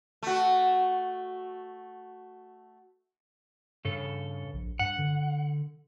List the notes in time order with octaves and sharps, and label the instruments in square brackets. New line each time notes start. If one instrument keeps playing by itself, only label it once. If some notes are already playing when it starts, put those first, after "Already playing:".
[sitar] A3 F#4
[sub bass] G2 [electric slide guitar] C#3 A4
[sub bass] A#1
[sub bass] G2 [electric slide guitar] F#5
[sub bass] D3